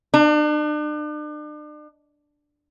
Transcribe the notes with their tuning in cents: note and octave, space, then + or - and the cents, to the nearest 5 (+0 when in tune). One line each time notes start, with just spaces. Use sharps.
D4 +40